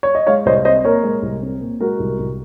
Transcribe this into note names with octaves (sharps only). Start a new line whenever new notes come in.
C#5
D#5
G#3 C#5 F5
C2 C5 D#5
C4 C5 D#5
A#2 A#4 C#5
G#3
C2
C4
A#2
G#3 F#4 A#4
C2
C2